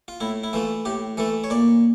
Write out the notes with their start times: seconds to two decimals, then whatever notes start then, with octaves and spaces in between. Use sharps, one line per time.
0.08 F4
0.20 A2 E4
0.44 E4
0.53 E3 A3 F4
0.85 A2 G4
1.17 E3 A3 A4
1.44 C#5
1.50 A#2 D5